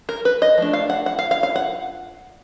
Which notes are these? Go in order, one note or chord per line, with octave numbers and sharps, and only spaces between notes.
A#4
B4
D#5
F3 A3 D4
F5
F#5
F#5
F5
F5
F5
F#5